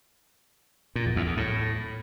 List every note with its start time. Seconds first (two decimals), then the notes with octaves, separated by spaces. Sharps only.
0.95 A#2
1.06 E2
1.16 E2
1.27 E2
1.37 A2